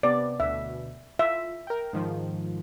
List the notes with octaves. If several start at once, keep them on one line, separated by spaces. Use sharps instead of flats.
C3 B3 D5
D2 B2 E5
F4 E5
A#4 G5
G#2 D#3 F3